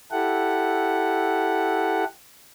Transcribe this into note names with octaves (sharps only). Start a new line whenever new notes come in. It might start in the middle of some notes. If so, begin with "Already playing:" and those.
E4 G4 A4 F#5